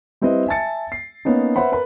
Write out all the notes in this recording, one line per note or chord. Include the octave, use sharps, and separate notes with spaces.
G3 C4 E4 B4 D#5
E5 G#5 A5 A6 C#7
C7
A#3 B3 C#4 D#4
B4 C5 E5 F#5 B5
A#4 B4 B5